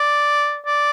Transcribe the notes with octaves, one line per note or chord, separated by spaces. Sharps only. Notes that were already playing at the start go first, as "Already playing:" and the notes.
Already playing: D5
D5